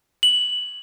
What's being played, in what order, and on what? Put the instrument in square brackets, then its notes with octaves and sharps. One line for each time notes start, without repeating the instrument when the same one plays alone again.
[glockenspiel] F#7